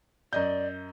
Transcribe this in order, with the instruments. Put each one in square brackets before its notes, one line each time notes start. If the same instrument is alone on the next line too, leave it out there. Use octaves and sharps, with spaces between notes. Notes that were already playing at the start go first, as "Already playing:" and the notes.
[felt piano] F#2 D#5 G6 [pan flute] D5